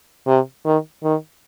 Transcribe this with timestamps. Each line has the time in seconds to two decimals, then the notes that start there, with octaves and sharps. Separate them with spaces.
0.27 C3
0.65 D#3
1.04 D#3